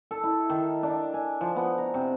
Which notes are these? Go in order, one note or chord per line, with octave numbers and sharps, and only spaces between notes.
A4
E4
D#3
D4
G#5
F3
B3
A#5
C3